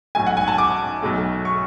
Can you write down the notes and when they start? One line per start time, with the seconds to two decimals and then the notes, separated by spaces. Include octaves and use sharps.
0.15 B1 A2 F#3 G#5
0.27 F#5
0.37 G#5
0.48 A5
0.58 D6
1.02 B1 B2 F#3 A3
1.45 C#6